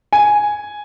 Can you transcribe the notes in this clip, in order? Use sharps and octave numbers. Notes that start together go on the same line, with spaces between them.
G#5